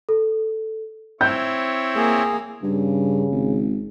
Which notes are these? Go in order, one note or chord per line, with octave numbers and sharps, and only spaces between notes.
A4
C4 E4 C#5 G6
A#3 G#4
G2 C#3
G#1